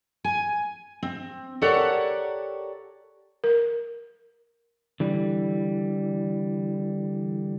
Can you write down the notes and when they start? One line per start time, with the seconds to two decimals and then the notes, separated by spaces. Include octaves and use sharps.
0.24 G#5
1.03 C4
1.62 G4 A4 A#4 C#5 D5 F#5
3.44 A#4
5.00 D3 E3 G3